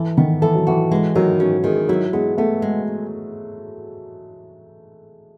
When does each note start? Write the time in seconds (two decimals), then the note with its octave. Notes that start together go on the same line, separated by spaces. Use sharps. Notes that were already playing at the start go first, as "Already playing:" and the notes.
Already playing: E3 A4
0.17 D#3 B3
0.42 E3 A4
0.55 F#3
0.67 E3 F#4
0.91 E3 G#3
1.15 D#3 F#3
1.40 F#3 C#4
1.64 D#3 G#3
1.89 F#3 E4
2.13 G#3 B3
2.38 A3 B3
2.62 G#3